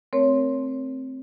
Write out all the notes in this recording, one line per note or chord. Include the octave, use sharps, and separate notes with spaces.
A3 C4 A#4 C#5